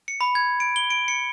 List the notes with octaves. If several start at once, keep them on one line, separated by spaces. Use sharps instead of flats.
C#7
B5
G#6
D7
G7
D7
C#7